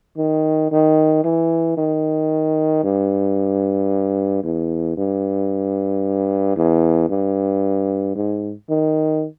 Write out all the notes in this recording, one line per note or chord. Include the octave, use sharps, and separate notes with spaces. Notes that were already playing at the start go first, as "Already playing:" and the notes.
D#3
D#3
E3
D#3
G2
E2
G2
E2
G2
G#2
D#3